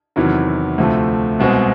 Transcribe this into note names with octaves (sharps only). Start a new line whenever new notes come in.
E2 C3 D#3 F#3 E4
D2 C3 F3 A3
C2 B2 G#3 C4